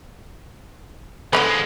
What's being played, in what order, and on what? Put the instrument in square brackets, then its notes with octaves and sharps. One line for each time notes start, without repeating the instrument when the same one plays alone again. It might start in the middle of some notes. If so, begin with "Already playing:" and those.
[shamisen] D3 D#3 B4 [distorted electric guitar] F3 G#3